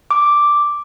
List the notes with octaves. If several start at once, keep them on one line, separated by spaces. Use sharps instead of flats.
D6